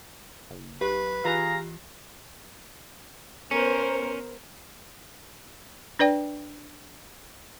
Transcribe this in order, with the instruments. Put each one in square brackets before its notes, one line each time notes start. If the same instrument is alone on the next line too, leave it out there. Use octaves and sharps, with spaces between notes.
[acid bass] F#1
[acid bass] B1 [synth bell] G4 [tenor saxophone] B4
[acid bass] E3 [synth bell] F4 G4 [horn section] G#4 F5 A#5
[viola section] B3 A#4 C5 [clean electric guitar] C#4
[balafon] D4 B4 D5 G5